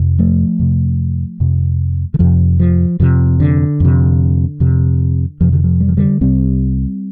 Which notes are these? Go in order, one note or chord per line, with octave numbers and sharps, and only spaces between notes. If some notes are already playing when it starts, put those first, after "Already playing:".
Already playing: F2 C3
F3 A3
F2 C3
F2 C3
D3
F2 C3 F3
F3
F2 C3 F3
D3
F2 C3
F2 C3
F2 C3 F3
D3
F3
G3
F3
D3 G3
C2 C3 G3 C4